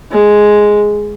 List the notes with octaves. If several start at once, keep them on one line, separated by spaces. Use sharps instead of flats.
G#3